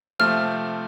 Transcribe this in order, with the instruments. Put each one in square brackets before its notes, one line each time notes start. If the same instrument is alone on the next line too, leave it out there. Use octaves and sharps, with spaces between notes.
[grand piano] C3 F3 A3 C4 [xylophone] F6